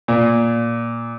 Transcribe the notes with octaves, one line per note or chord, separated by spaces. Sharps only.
A#2